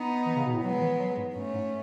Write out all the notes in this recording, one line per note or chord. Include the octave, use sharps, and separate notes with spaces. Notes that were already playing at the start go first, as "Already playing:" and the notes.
Already playing: B3 D#4
E3
C#3
B2
A2
F#3 G#3 B3
E3
F#3
G#2
G#2 A3 C#4
G#2